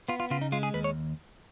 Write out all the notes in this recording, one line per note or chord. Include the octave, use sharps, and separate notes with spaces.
B3 F4
F4
C#3 F4
D#4
G#3 F4
G#4
D#2 B4
C#5